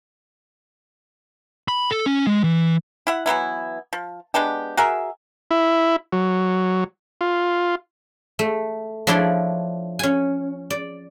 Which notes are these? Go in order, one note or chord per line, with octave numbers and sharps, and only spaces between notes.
B5
A4
C#4
G#3
E3
E4 E5 F#5
E3 F#3 B3 E4
F3
G#3 B3 D4 G4
F#4 G#4 A#4 E5
E4
F#3
F4
A3
F3 D4 E4 C#5 D5 C6
C#4 G#5
D5